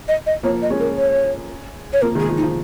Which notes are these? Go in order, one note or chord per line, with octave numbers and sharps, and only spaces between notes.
D#5
D#5
F3 A#3 C#5
D#5
G#3 C#4
A#4
C#5
C#5
F3 A#3 A#4
D#3 G#3 G#4
F3
D#4
F3